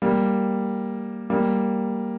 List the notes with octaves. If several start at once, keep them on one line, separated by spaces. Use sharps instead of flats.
G3 A#3
G3 A#3